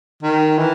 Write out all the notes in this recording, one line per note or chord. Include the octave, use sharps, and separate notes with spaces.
D#3
E3